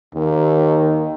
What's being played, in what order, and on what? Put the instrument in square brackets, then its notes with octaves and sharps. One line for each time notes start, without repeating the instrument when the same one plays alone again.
[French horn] D#2 [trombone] D#3